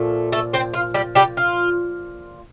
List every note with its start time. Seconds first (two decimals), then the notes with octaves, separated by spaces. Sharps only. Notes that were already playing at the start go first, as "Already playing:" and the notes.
Already playing: A#2 F3 A3
0.32 A3 A4
0.53 C4 C5
0.74 F4
0.94 G3 G4
1.15 G3 G4
1.37 F4